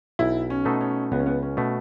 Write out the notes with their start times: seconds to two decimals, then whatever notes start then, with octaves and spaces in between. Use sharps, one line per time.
0.19 B1 E4
0.50 C#4
0.65 B2 A3 D#4 A4
0.81 C#4
1.12 C#2 B3
1.19 C#4
1.26 B3
1.43 C#4
1.57 B2 A3